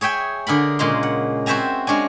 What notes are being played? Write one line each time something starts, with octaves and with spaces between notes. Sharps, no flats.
G#4 C#5 E5 G5 G#5
D3 G#4 A#4 B5
A#2 C#3 G#3 F5 C6
F#5
C4 F#4 C5 E5 G#5 A#5
G#3 C#4 D4 G#5